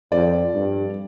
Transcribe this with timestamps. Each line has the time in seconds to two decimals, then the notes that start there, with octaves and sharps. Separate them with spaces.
0.12 F2 D5
0.54 G2